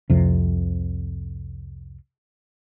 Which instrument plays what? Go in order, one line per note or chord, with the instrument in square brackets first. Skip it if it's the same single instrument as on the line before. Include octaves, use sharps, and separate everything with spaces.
[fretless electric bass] C2 F2 C3